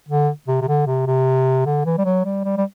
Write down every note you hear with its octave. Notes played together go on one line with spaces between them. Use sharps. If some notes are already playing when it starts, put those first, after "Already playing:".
D3
C3
C3
D3
C3
C3
D3
E3
G3
F#3
G3
G3
G3